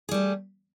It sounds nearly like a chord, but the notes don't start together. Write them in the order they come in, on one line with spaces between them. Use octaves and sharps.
G#4 G3 A3